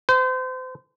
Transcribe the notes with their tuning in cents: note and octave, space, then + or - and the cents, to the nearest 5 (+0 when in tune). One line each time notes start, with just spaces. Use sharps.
C5 -35